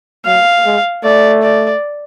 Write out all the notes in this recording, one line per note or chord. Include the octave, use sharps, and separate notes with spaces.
F#3 F5
G#3
A3 D5
D5